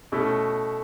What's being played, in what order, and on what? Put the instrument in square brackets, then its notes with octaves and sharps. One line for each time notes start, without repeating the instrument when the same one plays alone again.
[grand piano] B2 A3 C#4 E4